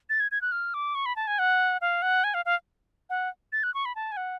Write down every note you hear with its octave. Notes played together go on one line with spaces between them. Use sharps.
A6
G#6
G#6
F#6
F6
D6
C#6
B5
A5
G#5
F#5
F5
F#5
G#5
F5
F5
F#5
A6
F#6
C#6
B5
A5
G#5
F#5